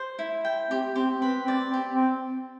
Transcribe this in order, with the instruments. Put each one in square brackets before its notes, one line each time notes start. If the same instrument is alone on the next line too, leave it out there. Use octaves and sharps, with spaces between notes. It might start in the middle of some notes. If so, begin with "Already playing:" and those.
Already playing: [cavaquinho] C5
E4
G5
[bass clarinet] C4 [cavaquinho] G4
[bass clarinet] C4 [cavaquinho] G4
[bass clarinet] C4 [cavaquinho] B4
[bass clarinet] C4 [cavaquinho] D5
[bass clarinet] C4 [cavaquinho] G4
[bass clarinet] C4